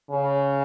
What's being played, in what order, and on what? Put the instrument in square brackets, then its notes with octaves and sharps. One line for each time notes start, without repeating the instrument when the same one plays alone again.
[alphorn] C#3